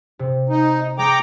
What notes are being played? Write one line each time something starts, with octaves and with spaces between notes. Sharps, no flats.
C3
D#4
G#3 G5 A#5 D6 C#7